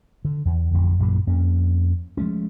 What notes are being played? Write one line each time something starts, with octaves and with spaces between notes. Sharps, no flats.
D3
E2
A1 F2 D3
A1 F#2 A#2 F#3
F2 A#3 C#4
F3 G#3 A3 C#4